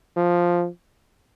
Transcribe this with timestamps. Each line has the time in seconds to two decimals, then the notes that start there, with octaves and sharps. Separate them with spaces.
0.16 F3